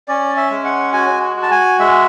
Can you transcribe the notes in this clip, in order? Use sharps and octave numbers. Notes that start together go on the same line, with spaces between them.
C#4 D5
E5
G#3
F#5
F#4 G#5
F#4
A5
G#5
G#3 E5